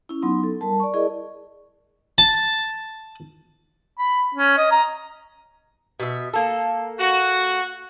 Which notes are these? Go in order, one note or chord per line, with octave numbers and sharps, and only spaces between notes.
C#4 E4
F#3 B3 D#4 C6
A4
G3 A#4 A5
D5 C#6
E4 G#4 A#4 D5 D#5
A5
B5
C#4
D#5
A#5
B2 E5
A#3 A4
F#4